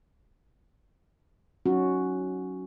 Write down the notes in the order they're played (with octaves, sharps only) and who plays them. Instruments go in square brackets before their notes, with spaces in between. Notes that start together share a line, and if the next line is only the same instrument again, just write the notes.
[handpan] F#3 C#4 D#4 F#4